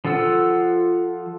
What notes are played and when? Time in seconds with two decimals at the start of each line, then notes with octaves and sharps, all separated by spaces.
0.05 F3 F4 A4 F#5 E6